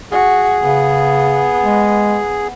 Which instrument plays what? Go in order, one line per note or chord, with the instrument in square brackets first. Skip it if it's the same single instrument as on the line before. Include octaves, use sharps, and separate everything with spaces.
[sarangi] F#4 [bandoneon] G#4
[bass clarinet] C#3 [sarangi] B3
[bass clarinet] G#3